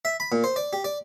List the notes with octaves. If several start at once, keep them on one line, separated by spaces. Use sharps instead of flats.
E5
B5
A#2
C5
D5
G4
D5